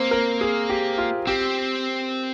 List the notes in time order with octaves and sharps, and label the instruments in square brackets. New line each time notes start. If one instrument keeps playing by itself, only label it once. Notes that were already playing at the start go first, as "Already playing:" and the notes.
Already playing: [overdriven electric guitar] A#3 [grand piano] C4
[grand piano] A#4
G#4
G4
F4
[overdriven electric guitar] C4 [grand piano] G4